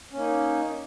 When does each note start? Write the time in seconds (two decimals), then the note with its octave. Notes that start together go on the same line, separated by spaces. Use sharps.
0.12 C#4
0.16 A#3
0.19 D#4